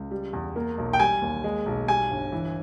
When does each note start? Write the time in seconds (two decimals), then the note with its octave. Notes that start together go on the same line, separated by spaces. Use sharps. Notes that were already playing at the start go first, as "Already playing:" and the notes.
Already playing: C#2
0.11 G3
0.33 E2
0.56 A#3
0.78 B1
0.93 G5
1.00 G3 G#5
1.22 D#2
1.44 G#3
1.66 B1
1.88 G3 G#5
2.11 G1
2.32 E3